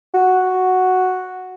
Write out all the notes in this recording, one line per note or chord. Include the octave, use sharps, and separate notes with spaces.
F#4